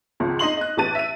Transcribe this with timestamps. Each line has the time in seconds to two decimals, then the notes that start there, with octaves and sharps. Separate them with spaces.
0.20 G#1 C#2 F3
0.39 D#4 D#5 C6 F#7
0.57 D#5 F#6
0.77 A1 E3 G4 A5 A6 D#7
0.95 E5 D#7